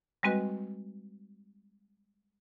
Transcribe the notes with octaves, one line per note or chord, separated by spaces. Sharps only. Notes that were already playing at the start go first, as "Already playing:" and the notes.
G3 G#3 C4 F#4 B4 D#5